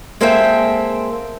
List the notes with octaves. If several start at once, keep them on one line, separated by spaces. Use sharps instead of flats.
G#3 A#3 C4 A4 E5 G5